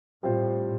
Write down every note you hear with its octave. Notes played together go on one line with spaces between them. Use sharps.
A2 G3 C4 F4 C5